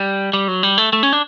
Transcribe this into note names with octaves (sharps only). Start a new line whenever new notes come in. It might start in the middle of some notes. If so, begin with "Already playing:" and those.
Already playing: G3
G3
F#3
G3
A3
A3
C#4
D4